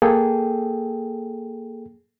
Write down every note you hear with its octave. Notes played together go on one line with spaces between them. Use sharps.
A#3 G#4 A4 G5